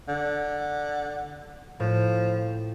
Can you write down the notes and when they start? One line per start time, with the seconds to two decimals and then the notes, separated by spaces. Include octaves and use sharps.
0.08 D3
1.80 A2 F3